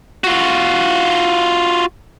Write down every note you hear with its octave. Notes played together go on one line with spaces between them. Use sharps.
F4 F#4